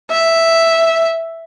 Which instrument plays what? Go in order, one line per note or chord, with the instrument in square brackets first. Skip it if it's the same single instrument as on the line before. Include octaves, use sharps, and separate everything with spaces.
[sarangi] E5